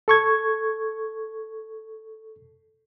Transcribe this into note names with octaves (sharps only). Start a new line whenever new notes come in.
A4 C#6 G#6